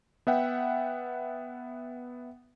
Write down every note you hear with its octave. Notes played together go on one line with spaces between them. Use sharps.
B3 E5 F#5 G5